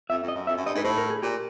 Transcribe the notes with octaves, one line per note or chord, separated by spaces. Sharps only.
F2 E5
F2
D#5
F#2
F2 E5
F#2
G2 D#5
G#2 B4
A2 C5
A#4
G#4
A#2 G4